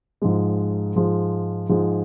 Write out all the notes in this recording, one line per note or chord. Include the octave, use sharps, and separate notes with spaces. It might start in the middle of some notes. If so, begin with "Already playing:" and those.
G#2 F3 G#3
G#2 F3 G#3
G#2 F3 G#3